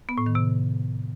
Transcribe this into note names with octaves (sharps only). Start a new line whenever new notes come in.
B3
A2
D#3
C3